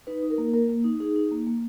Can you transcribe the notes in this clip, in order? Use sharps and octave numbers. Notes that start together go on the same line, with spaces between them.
D#4 B4
D#4
A#4
A#3
A#3 A#4
A#3
D#4
D#4 G#4
D#4
A#3
A#3